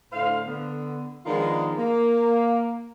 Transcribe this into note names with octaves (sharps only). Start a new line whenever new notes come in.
A2 D3 C5 F5
D3 B3
D#3 F3 G#3 B3 D4 F4
A#3